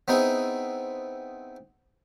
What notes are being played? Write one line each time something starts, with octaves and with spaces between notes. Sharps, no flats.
B3 C4 D#4 E4 G#4